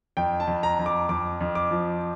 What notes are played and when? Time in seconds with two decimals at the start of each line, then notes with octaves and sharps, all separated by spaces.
0.17 F2 G5
0.40 A5
0.47 F2
0.63 A#5
0.79 F2
0.86 D6
1.09 F2 D6
1.41 F2
1.55 D6
1.71 F3